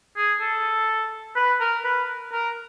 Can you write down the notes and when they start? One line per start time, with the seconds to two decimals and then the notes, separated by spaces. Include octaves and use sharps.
0.17 G#4
0.40 A4
1.36 B4
1.60 A#4
1.85 B4
2.33 A#4